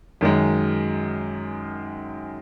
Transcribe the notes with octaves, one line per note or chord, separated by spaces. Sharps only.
F#2 D#3 G#3